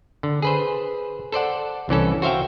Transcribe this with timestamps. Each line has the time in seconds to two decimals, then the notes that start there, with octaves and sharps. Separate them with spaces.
0.23 D3
0.42 G#4 B4 C5
1.32 A4 C5 D5 F#5
1.89 C2 E3 C#4 A4
2.22 F#4 C5 E5 F5 G5